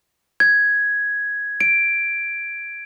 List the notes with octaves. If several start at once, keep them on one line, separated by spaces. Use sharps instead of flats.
G#6
D7